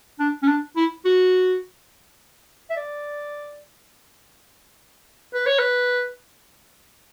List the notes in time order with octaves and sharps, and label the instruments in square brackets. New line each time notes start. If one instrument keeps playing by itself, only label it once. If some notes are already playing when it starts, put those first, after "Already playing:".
[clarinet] D4
C#4
D4
E4
F#4
E5
D5
B4
C#5
B4